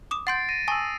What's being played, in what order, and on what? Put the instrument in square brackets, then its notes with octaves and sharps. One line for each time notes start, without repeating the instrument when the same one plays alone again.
[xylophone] D6 D#6 E7
[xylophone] F#5 C6 G6 [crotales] A6 C7 D7
[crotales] A#6 D#7
[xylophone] G#5 A5 C#6 [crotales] D#6 E6